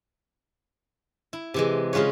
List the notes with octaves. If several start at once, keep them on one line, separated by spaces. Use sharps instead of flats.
E4
C3 E3 G#3
C#3 G#3 F4 B4 C#5